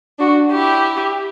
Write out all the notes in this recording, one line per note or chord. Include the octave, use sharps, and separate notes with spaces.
D4 F#4
E4 G4